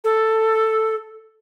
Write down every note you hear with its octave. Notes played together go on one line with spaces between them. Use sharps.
A4